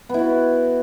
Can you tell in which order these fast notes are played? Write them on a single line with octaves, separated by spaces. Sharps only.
B3 E4 F#4